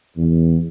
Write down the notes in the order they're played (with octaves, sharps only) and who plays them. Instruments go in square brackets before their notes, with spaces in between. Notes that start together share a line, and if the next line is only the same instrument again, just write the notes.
[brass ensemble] E2